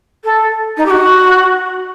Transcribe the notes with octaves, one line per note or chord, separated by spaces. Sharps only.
A4
D#4
G4
F#4